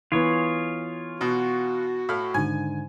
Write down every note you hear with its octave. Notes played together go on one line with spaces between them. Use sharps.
E3 B3 F4 G#4 B4 C#5
B2 F#4
A2 F5 B5
G#2 D3 D#3 G#5